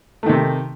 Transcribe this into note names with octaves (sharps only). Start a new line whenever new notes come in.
C3 D#3 A3